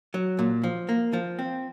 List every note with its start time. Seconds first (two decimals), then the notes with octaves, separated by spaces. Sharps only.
0.14 F#3
0.39 A#2
0.63 F3
0.89 A#3
1.13 F3
1.39 C4